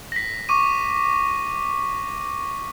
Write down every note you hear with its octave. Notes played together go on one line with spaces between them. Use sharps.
A#6 B6
C#6 D6 D#7